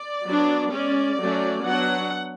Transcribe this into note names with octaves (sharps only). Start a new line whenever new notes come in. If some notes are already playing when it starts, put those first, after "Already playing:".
Already playing: D5
F#3 B3 D4
G#3 C#4 D5
F#3 A3 C#4
F#3 B3 D4 F#5